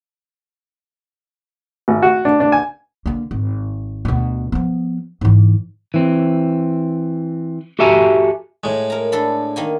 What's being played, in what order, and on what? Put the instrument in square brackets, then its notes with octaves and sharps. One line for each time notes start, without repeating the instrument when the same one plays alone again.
[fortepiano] G#1
F#4
D4
D4
G#5
[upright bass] D3 A#3
G#1
D2 B2
F3 B3
G#2 E3
[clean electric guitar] E3 C4
F#4 G4 A4 E5 G#5 A#5
[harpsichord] A2 G#3
[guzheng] A#4 A#5
D4 A4 B5
D#3 A#3 G#5